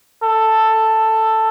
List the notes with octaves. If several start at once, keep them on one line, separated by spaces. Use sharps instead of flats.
A4